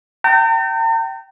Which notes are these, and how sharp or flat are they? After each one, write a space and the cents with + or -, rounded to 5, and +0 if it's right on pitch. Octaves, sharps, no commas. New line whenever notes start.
G5 -25 A#5 -45